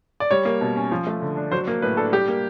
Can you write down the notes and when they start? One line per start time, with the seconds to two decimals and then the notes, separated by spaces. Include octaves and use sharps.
0.20 D5
0.31 G3 C#5
0.45 A#3
0.61 B2
0.76 C#4
0.92 F3
1.07 A3
1.22 D3
1.37 D4
1.52 F#3 C5
1.68 A#3
1.82 A2 B4
1.97 D4 A4
2.12 G3 G4
2.28 A#3